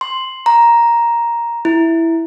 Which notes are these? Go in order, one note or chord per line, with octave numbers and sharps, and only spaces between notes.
C6
A#5
E4